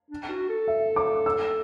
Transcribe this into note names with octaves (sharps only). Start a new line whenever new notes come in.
D4
F#4
A4
E5
D6
E6